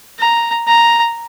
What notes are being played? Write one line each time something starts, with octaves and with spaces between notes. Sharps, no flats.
A#5
A#5